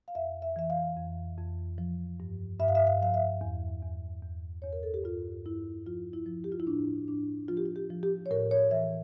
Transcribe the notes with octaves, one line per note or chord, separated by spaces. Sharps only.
F5
F2 E5
E5
E3 E5
F5
F2
F2
F3
G2
G2 E5
F5
E5
F5
F3 F5
E5
E2
E2
E2
E2 C#5
A#4
A4
G4
G2 F4
G2 E4
F3 F4
E4
F3
G4
F4
E4
A2 D4
A2 D4
F3 F4
G4
F4
G4
F3
G4
C#5
A2 A#4
C#5
E3 E5